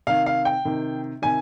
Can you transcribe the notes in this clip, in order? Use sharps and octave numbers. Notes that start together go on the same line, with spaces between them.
C3 D#3 F5
F5
G5
C3 D#3
C3 D#3 G#5